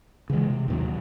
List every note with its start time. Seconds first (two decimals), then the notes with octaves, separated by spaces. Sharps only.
0.30 C#3 E3 G3 G#3
0.50 C3
0.68 D#2 A#2 F#3